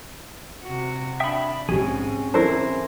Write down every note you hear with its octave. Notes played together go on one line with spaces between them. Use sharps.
C3 F#4
D4 E5 G5 B5 D#6
A#1 G#2 C3 C4 C#4 G#4
E3 D4 E4 A4 A#4 C5